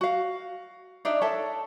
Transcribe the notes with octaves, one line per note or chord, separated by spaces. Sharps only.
F#4 F5
D4 D#4 D5 E5
A4 C#5 E5 A5